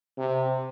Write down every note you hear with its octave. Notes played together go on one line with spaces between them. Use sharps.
C3